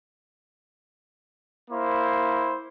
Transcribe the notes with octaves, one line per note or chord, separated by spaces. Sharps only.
A#3 E4 C5